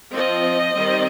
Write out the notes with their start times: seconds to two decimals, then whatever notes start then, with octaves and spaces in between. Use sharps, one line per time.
0.13 F3 C4 D#5
0.73 D#3 G3 C4